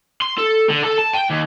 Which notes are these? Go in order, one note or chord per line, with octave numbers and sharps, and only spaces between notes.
C6
A4
D3
A4
A5
G5
D#2